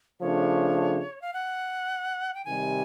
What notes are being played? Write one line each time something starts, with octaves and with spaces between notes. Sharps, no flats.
C#3 F3 A3 D4 C#5
F5
F#5
G5
C3 D#3 G3 G#5